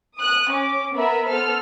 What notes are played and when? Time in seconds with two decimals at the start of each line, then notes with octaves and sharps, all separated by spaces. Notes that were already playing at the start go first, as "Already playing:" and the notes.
0.16 D#6 F#6
0.50 C#4 D6
0.95 B3 A#4 E5 B5
1.27 B3 A4 C5 F6